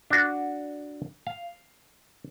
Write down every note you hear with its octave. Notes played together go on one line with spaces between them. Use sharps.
D4 F#4
F5